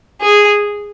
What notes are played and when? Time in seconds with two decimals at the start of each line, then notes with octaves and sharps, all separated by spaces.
0.21 G#4